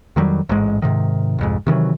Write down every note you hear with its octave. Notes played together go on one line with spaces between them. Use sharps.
F2 D#3 F#3 G3
A1 G#2 G#3
G#2 C3 D#3
C2 F2 G#2
C3 D#3 E3 F#3